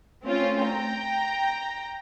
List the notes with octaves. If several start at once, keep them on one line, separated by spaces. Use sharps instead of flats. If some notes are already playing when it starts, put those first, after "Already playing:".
A3 C4 C#4 F4
G5 A#5